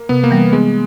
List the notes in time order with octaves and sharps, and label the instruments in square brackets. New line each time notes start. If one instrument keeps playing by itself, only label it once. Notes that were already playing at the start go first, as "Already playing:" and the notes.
Already playing: [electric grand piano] A#3
[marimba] C3 [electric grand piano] B3
[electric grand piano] A#3
[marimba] E3 G3 B3
[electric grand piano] G#3 [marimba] B3